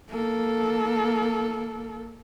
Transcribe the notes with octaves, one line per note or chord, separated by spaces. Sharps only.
A#3 A4